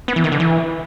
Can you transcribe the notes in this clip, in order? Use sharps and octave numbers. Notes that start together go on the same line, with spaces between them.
B3
E3
D#3
D3
E3